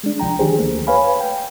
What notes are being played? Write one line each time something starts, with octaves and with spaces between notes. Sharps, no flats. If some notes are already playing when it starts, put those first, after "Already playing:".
G#3 D4
C2 F3 G5 A#5
D#3 F3 D4 G4 G#4 C5
D2 A3 A#3
B4 C#5 F5 G#5 B5
G5